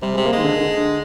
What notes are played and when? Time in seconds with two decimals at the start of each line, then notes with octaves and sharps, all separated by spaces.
0.02 C3 G3
0.14 C3 G#3
0.25 A#3
0.32 D#3 G#3
0.45 D3
0.61 D3